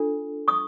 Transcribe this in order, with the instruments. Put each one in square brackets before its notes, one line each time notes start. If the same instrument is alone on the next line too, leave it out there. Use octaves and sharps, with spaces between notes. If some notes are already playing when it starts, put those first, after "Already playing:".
Already playing: [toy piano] D4 F4 A4
C#6 D#6